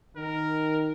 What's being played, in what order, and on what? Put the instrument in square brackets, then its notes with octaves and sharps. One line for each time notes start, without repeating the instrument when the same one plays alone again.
[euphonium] D#3 [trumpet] A#4